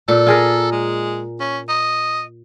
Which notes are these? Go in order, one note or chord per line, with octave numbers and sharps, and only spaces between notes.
A#2 A4
F4 G#4 A#4
G#3
C#4
D#5